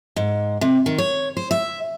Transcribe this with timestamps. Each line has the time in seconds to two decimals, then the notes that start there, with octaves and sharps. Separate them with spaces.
0.16 G#2
0.61 C3
0.86 D#3
0.98 C#5
1.37 C5
1.51 E5